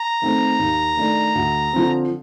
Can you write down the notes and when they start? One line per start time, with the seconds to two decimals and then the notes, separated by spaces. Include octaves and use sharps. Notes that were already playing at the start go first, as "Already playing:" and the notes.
Already playing: A#5
0.22 D#3 A3 C4
0.59 D#2
0.97 D#3 A3 D4
1.35 D2
1.73 D3 F3 C4